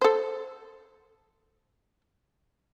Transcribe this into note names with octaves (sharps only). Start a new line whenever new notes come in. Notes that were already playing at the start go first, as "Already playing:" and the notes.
A4 C5